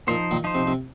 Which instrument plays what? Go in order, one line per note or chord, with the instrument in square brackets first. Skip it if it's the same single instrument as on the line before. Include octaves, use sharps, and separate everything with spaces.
[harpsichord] A#2 [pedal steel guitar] F3 D#4 C5
[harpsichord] A#2 D#3
[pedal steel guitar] F3 D#4 C5
[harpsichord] C3
C3